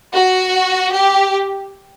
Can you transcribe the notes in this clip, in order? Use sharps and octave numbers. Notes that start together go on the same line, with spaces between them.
F#4
G4